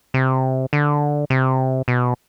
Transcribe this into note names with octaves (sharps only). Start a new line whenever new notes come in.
C3
D3
C3
B2